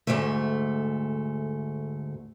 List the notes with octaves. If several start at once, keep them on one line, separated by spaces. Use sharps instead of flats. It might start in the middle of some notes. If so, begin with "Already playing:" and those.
D2 G#2 A3